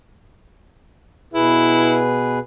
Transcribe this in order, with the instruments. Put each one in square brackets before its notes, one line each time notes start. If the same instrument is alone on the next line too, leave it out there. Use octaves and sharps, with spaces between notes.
[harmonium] B2 G#4 B4 [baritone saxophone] E4